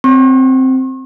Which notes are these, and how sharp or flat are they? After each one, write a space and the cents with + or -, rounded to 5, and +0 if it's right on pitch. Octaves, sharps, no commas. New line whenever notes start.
C4 +0 C#6 -45